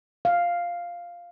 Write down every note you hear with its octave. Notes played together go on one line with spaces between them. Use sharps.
F5